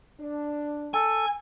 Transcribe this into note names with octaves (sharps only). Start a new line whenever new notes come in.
D4
A4 G#5